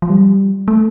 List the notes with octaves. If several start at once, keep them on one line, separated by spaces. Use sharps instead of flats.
F3
G3
A3